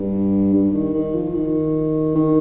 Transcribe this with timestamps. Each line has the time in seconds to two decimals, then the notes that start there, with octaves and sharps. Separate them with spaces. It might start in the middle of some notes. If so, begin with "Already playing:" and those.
Already playing: G2
0.54 G2
0.74 D#3
0.94 D#3
1.15 F3
1.35 D#3
2.15 D#3